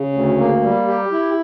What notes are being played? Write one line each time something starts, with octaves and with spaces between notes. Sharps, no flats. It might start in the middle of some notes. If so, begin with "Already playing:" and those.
Already playing: C#3
D2
A#3
G3
G4
E4